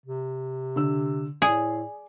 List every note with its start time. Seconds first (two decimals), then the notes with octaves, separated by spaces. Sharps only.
0.06 C3
0.76 D3 E6
1.42 A2 G#4 D5